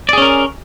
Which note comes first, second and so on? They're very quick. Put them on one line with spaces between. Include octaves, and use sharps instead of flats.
D5 G#4 C#4 A#4